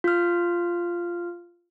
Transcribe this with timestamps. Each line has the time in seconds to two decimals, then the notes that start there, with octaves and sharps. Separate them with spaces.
0.04 F4 F6